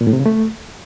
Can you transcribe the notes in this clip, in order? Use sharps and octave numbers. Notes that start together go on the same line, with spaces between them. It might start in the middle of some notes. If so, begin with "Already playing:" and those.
A#2
A2
C3
C#3
A3